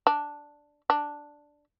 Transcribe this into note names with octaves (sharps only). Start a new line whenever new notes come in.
D4
D4